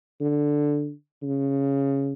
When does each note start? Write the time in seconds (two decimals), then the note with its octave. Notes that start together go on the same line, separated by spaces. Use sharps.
0.21 D3
1.23 C#3